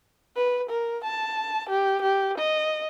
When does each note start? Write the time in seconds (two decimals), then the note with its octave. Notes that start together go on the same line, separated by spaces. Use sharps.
0.36 B4
0.70 A#4
1.04 A5
1.69 G4
2.02 G4
2.38 D#5